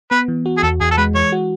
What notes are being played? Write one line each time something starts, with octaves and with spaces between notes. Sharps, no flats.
B3 B4
E3
F#4
G#4
E2 A4
E2 G#4
A4
G#3 B4
E3 C#5
F#4